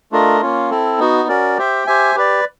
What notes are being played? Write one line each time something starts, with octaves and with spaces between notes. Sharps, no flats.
A3 D4 F4 A#4 D#5
A#3 C#4 F4
C4 E4 A4
B3 D#4 F#4
C#4 F#4 A#4 D5
G4 C5 E5 G5
G4 C5 E5 G#5
G4 B4 D5